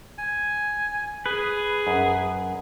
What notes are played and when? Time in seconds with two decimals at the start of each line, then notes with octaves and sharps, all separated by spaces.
0.18 G#5
1.26 G#4 B4
1.87 F#2